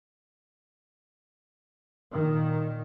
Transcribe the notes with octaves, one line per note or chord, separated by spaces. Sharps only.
A#2 D#3